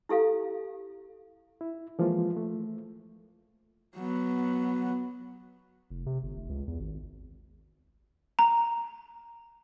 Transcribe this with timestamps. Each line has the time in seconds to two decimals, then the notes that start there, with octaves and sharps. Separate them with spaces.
0.09 E4 G4 A4 F5
1.61 E4
1.99 E3 F3 G#3 A#3 F4
2.37 A3
3.97 F#3 B3
5.90 F1
6.06 C3
6.23 G1
6.37 F1
6.49 C#2
6.68 E2
6.80 G#1
8.39 A#5